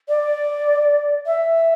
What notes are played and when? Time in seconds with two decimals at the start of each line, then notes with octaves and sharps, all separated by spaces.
0.09 D5
1.26 E5